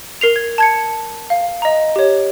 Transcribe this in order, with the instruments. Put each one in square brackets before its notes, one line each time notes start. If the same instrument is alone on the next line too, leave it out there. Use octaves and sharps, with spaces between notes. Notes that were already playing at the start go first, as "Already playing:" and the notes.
[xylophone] A#4 C7 F7
G#6
A5 G#6 C#7
F5
D#5 A#5
G4 C#5